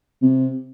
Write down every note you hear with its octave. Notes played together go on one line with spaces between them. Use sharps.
C3